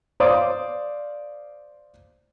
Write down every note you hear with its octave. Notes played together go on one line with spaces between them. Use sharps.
C5 D5 F5 C6 D6 D#6